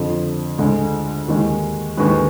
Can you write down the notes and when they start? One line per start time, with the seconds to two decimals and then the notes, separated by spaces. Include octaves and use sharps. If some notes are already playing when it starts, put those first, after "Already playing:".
Already playing: F2 D3 F3
0.58 D2 D3 G#3
1.28 D#2 D#3 G#3
1.97 D#2 D3 G#3 B4